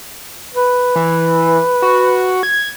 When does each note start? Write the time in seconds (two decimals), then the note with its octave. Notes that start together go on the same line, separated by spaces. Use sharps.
0.54 B4
0.96 E3
1.82 F#4
2.43 G#6